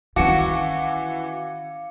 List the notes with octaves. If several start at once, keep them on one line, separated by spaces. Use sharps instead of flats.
D#3 E3 C#4 F#4 F5 D6 C#7